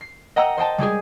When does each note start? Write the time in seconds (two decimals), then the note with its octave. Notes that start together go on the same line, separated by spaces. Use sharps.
0.01 C7
0.36 D#5 F#5 G5 A#5 E6
0.58 C5 D#5 G5 A5
0.78 G3 G#3 G4 G#4